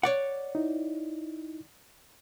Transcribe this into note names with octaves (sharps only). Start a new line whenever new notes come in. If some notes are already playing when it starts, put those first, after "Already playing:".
C#5 D5 F#5
D#4 E4